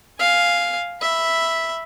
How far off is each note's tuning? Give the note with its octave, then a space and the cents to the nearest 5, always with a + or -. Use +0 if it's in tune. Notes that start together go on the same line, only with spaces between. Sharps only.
F5 +0 G#5 +0
E5 +0 B5 +0